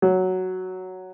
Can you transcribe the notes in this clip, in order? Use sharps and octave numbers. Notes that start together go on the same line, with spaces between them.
F#3